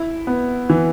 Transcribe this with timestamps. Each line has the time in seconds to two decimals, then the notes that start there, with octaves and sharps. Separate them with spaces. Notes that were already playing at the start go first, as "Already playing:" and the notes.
Already playing: E4
0.27 B3
0.70 E3